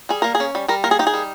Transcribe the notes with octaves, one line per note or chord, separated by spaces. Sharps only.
G3 G#4
A#3 A#4
G#4
C#4
G3
G3 A#4
A#3 A#4
G#4
D#4 G4
G#4
G3